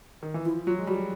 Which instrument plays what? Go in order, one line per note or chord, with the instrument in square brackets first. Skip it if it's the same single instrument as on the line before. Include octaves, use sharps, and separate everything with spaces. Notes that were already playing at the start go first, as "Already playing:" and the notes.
[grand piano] D#3
E3
[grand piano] F3 [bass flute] E4
[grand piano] F#3 [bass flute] F4
[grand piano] G#3
[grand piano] G3 [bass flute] F#4